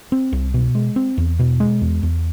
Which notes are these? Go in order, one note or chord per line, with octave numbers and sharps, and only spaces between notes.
C4
C2
B2
G#3
C4
E2
B2
G#3
E2
E2